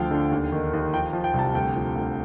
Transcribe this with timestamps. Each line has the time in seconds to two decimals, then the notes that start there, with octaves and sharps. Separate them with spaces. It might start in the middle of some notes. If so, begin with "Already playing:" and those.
Already playing: D2 F3 F5 G5
0.11 D3
0.31 D#2
0.52 D#3
0.73 D#2
0.94 F3 G5
1.13 F3
1.24 G5
1.34 C2 A5
1.54 D2 G5
1.76 F3
1.96 D2